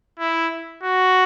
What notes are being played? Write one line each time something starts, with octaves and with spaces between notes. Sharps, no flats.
E4
F#4